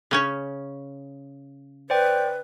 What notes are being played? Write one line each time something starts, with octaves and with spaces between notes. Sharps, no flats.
C#3 C#4 C#5
B4 C5 D5 G5